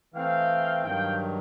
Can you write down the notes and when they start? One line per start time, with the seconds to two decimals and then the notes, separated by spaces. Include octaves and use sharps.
0.14 E3 A3 C4 F5 G5
0.83 G2 D#3 F#3 F5 G5